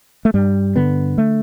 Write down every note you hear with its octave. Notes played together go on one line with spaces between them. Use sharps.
A3
G2 G3
D3 B3
A3